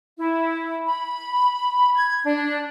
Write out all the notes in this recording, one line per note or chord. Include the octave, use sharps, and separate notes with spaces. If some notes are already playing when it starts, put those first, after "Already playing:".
E4
B5
G#6
D4